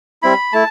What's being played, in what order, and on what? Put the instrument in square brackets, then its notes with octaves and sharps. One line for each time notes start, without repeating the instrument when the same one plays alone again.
[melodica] G3 C4 E4 B5
A3 E4 A5